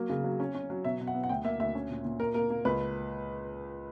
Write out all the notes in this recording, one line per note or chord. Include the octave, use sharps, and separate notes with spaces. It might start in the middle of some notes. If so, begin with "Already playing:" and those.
Already playing: F#3 A#3
C#3
F#3
C#4
C#4
F#3
B2 E5
B2
F#5
B3
F#5
D2 G5
A#3 E5
D2 E5
C#4
A#2
A#2
A#3 A#4
A#3 A#4
A#3
C#2 B4